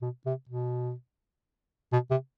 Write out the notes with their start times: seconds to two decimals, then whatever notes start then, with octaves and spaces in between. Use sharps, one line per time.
0.02 B2
0.26 C3
0.49 B2
1.93 B2
2.11 C3